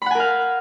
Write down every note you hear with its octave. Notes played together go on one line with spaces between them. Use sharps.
A#4 F5 F#5 G#5 B5